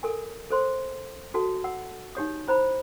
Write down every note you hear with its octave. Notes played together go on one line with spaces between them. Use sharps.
A4 A#4 G#5
A4 C5 C6
F#4 A4 A5
F#5 E6
D#4 G4 C#5 D#6
E4 C5 A#5 B5